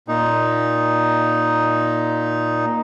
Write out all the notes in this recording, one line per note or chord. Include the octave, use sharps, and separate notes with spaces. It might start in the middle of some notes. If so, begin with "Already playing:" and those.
A#2 D#4